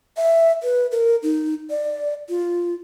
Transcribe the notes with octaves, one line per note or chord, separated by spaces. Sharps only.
E5
B4
A#4
D#4
D5
F4